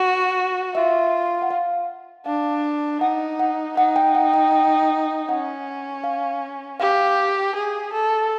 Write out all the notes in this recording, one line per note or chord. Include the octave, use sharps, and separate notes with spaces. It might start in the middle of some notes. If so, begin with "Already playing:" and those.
Already playing: F#4
F4 E5
F#5
F5
D4 F5
D#4 F#5
F#5
D#4 F#5
G5
F#5
G5
G5
C#4 F#5
F5
G4 F5
G#4
A4